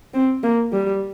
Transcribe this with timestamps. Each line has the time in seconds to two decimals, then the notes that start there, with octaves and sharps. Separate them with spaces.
0.14 C4
0.43 A#3
0.72 G3